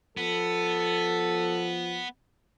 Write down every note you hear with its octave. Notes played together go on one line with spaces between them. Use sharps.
F3 B3 A4